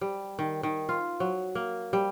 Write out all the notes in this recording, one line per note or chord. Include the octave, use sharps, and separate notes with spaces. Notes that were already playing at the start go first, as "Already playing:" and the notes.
G3
D#3
D#3
F4
F#3
A#3
G3